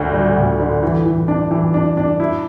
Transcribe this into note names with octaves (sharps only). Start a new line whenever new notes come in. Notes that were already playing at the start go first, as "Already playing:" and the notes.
Already playing: D2 D3
G3
D2
D3
E3
E3
D4
E3
D4
D4
E4